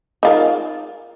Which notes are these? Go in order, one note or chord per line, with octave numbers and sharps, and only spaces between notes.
D#4 F4 A#4